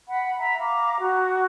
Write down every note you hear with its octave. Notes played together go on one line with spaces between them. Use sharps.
F#5 B5
E5 A#5 B5
F5 A#5 D6
F#4